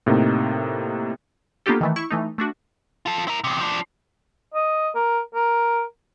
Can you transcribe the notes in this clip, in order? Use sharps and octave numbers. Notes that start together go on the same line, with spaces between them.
A2 C3 A#3 D#4
A#3 B3 D4 F4 G4 A4
D#3 E3 A3
E4 C#6
E3 A3 D#4
A3 D4 F#4
F4 A4
E4 A#4
E2 C3
F3 D4
D#5
A#4
A#4